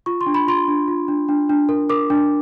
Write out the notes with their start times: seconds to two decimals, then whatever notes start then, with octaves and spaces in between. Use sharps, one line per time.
0.06 F4 C#6
0.21 C6
0.26 D4
0.34 B5
0.48 F4 C6
0.68 D4
0.88 F4
1.08 D4
1.29 D4
1.50 D4
1.69 A#4
1.90 A#4 D6
2.10 D4